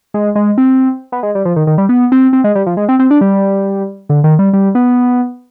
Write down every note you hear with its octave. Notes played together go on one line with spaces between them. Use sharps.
G#3
G#3
C4
B3
G#3
G3
F3
D#3
D#3
G3
B3
C4
C4
G#3
G3
F3
G#3
C4
C4
D4
G3
D3
D#3
G3
G3
B3